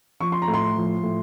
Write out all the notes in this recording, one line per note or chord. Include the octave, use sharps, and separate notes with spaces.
F3 C#6
C6
A#5
A2
C6
F3
A2